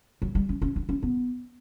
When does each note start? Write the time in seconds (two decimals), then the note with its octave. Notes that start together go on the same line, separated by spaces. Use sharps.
0.22 F#3
0.35 G3
0.49 C#4
0.62 C#4
0.76 D4
0.89 C#4
1.02 B3